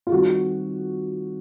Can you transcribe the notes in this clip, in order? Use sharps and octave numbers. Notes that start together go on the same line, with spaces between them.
F4
D#3 G3 C4 D#4 F#4